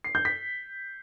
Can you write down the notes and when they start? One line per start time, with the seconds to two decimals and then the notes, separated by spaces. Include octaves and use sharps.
0.04 C7
0.15 G6
0.25 B6